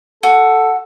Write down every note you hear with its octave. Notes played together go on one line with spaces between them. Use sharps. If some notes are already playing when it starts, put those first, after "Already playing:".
F#4 A4